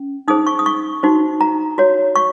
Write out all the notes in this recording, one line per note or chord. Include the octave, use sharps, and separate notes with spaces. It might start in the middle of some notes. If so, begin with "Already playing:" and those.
Already playing: C#4
D#4 G#4 C5 D#6
C#6
D#6
C#6
D#4 F#4 C5
A#5
F#4 C#5
C#6